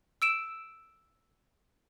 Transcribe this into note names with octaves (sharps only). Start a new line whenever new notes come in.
E6 D7 E7